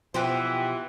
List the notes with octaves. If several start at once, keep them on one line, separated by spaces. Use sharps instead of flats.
B2 E3 F3 B3 F#4 G4 C5